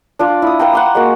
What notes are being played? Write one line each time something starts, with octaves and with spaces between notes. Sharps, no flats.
D4 F4 D5
E4 D#6
B4 F5 G5 A#5
F#5 C6 D6
G#3 A#3 F#4